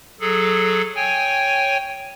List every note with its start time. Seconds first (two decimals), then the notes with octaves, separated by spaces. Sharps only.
0.21 F#3 G#4 A4
0.96 C#5 G5 G#5